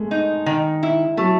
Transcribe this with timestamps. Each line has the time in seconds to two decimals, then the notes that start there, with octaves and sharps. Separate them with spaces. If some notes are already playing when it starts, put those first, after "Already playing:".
Already playing: G#3 A3
0.11 D#4
0.46 D#3
0.83 E4
1.17 F#3 A3